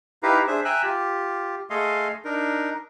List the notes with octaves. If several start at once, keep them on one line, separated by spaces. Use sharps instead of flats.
D#4 E4 G4 B4 F5 A#5
D4 G#4 C5 E5
E5 G5 G#5 A#5 E6 F#6
F4 G4
A3 G#4 A4 D#5 F5 C6
D4 D#4 A#4